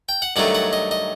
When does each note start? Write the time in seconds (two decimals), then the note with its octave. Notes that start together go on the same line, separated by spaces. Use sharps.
0.09 G5
0.22 F#5
0.36 G2 D#3 F#3 A3 F#5
0.55 F#5
0.73 D#5
0.91 D#5